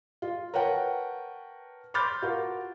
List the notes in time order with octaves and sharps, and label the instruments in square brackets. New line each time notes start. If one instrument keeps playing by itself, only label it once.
[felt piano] F4
A#4 B4 C#5 F#5 G5 A5
B5 C6 D6 F6 G6 A6
F4 F#4 A#4